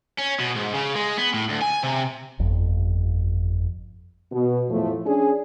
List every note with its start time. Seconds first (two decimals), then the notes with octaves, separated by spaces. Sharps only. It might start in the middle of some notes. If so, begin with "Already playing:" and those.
0.19 C#4
0.40 B2
0.56 G#2
0.74 C#3
0.95 G#3
1.18 B3
1.34 A2
1.49 D2
1.62 G#5
1.83 C3
2.39 G1 F2
4.32 B2
4.69 E2 A2 F3 A3
5.04 C#4 D4 G#4